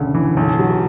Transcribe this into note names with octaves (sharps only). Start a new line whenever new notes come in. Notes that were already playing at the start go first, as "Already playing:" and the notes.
Already playing: E1 D2 C#3
E3
B1
F#3